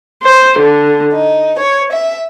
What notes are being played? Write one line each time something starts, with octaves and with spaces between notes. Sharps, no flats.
C5
D3
D#4
C#5
E5